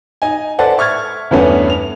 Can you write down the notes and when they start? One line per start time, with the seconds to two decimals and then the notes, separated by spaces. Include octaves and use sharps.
0.22 D#4 G#5
0.58 A4 B4 C5 D5 F#5 A5
0.78 E5 C#6 F6 G#6 A6
1.31 E2 G2 A3 B3 C#4
1.70 F7